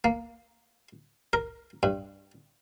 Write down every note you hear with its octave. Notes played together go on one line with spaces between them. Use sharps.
A#3
A#4
G2